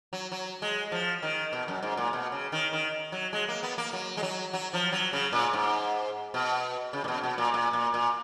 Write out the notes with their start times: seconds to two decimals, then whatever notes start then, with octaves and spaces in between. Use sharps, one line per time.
0.13 F#3
0.32 F#3
0.62 G#3
0.92 F3
1.23 D#3
1.53 B2
1.68 F#2
1.83 G#2
1.97 A#2
2.13 B2
2.32 C#3
2.52 D#3
2.73 D#3
3.12 F#3
3.33 G#3
3.48 A#3
3.63 B3
3.78 A#3
3.93 F#3
4.17 G#3
4.23 F#3
4.53 F#3
4.73 F3
4.93 F#3
5.13 C#3
5.33 A#2
5.53 G#2
6.34 B2
6.93 C#3
7.04 A#2
7.08 B2
7.24 B2
7.38 A#2
7.54 A#2
7.73 A#2
7.94 A#2